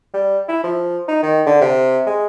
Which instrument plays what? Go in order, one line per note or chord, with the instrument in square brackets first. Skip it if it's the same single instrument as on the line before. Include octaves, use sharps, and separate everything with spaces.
[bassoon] G3
E4
F3
D#4
D#3
D3
C3
G#3